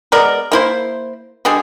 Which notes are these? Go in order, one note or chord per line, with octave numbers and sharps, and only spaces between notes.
G#3 B3 A#4 D5
A#3 E4 C5
B2 D3 G3 G#4